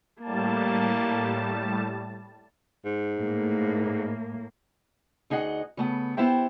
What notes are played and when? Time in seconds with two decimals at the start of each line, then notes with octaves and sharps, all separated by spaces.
0.22 A2 G3 A#3 A5
2.85 G#2
3.18 A2 A#3
5.30 D2 D#4 G#4 D#5 F#5
5.77 C#3 A3 B3
6.17 B3 E4 G4 C5 E5 G5